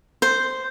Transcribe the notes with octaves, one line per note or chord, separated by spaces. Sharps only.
C5